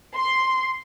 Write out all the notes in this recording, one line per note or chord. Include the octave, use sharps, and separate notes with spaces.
C6